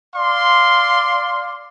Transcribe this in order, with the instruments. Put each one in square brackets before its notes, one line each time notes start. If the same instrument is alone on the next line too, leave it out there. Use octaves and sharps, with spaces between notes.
[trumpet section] D5 F5 C6